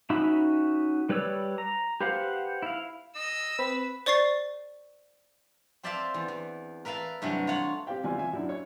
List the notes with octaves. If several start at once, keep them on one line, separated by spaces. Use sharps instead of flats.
C#4 D#4 F#4 E5 B5
G3 B4 C#5 D5 E6
A#5
G4 B4 C5 F5 F#5
E4 F5
D#5 E6
C4 B4 B5
C5 D5 C#6 A6 C7
C4 C5 D5 E5 F5 A5
E2
E2
A#4 B4 E5 F5 A5
G2 C3 E3 F#3 A3
F4 C#5 F5 F#5
C4 G4 C5 F5 G5
E2 G3 F4 G#5 C6
C#4 E5 G#5
F#2 D4 E4
C#5 C#6